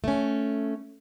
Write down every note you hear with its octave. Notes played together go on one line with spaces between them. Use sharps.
A3 C#4